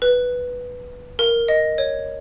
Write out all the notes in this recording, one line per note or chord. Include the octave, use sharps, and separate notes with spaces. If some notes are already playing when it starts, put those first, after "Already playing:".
B4
A#4
D#5
C#5